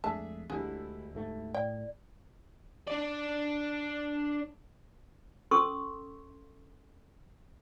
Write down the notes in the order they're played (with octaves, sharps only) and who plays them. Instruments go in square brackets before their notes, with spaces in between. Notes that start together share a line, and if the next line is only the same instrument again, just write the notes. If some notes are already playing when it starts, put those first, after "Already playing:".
[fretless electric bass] F2 G#3 A3 [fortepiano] D4 G#4 E5 [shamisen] A5
[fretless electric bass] D2 G#3 [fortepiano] D3 G3 E4 [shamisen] G#4
[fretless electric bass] D2 G#2 A3
[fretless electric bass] A2 [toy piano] D5 [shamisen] G5
[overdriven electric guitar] D4 D5
[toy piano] C#4 A4 C6 C#6 D#6 E6